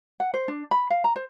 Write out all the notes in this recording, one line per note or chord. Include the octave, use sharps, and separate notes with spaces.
F#5
C5
D4
B5
F5
A#5
C5